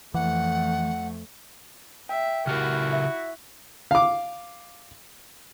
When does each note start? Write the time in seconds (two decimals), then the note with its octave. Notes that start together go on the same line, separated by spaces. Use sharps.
0.14 F2 E3 A3 F#5
2.09 E5 G5
2.47 C#3 E4 F#4 G4 A#4 F6
2.93 E5
3.91 F5 D6